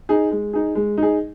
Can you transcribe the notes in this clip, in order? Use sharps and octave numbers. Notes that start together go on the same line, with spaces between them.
D#4 G#4
G#3
D#4 G#4
G#3
D#4
G#4